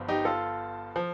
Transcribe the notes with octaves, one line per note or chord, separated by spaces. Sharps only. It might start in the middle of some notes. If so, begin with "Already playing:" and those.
Already playing: G1 G2 F3
D#4 G4
F4 A4
F3